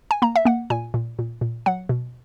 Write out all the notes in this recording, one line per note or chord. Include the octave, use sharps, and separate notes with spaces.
G#5
A#3 A#5
E5
A#3 F#5
A#2 G#5
A#2
A#2
A#2
F#3 F#5
B2